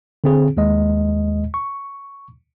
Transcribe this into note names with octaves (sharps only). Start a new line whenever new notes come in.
D3 C4 G#4
D#2 G#3 D#5
C#6